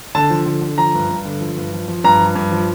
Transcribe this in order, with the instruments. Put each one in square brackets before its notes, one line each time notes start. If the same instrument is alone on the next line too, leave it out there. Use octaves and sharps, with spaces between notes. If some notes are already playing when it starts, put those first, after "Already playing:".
[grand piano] D3 A5
F3
D3
D3
F3 A#5
G2
G2
D3
F3
G2
F3
F3
G2 A#5
F3
G2
F3